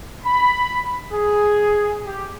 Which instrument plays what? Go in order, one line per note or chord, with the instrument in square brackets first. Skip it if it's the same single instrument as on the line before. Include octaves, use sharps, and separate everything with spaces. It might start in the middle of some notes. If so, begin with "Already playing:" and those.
[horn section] B5
G#4
G4